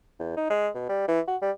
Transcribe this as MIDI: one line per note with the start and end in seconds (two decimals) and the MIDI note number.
0.20 0.32 40
0.36 0.46 63
0.50 0.68 56
0.74 0.84 47
0.89 1.08 55
1.08 1.20 52
1.27 1.37 66
1.42 1.51 55